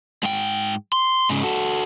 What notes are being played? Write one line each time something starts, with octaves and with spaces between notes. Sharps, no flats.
G#2 G5
C6
G#2 C#3
F#4 A4